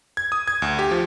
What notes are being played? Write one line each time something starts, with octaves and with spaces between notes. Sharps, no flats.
G#6
D#6
G#6
D2
G4
F3